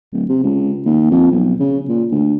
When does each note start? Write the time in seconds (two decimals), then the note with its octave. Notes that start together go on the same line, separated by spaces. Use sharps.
0.12 D1
0.29 C3
0.43 C#2
0.85 D#2
1.11 F2
1.31 B1
1.60 C#3
1.88 A#2
2.11 D2